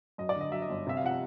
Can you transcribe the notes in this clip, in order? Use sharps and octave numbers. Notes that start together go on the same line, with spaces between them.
F#2 D#5
D5
D3 D#5
F#3 E5
D#5
G1
C3 E5
F5
F3 F#5